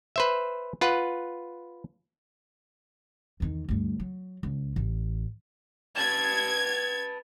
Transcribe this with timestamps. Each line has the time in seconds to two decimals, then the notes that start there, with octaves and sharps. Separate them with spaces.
0.16 B4 C5 E5
0.81 F4 B4 F#5
3.40 E2 D#3
3.69 D2 G2
4.00 F#3
4.43 C#2
4.76 A1
5.98 B4 A5 G#6